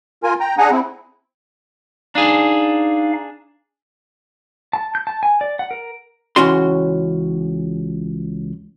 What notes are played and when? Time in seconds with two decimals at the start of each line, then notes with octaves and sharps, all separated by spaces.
0.23 F4 A#4 G#5
0.40 G5 A#5
0.58 D4 G#4 F#5 G#5 A#5
0.71 C4 E4
2.15 D4 D#4 G#4 F5
4.73 A5
4.95 G6
5.07 A5
5.23 G#5
5.41 D5
5.59 F#5
5.71 A#4
6.36 C#2 E3 C#4 F#4 C6